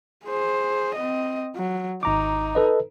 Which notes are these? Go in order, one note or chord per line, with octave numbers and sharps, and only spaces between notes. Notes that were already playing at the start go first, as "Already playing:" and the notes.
G#4 C5
C4 D#5
F#3
G#1 D#4 A#5 D6
A4 B4 D#5